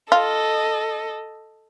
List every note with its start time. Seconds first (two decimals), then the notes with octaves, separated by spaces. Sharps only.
0.12 F4 A4 D#5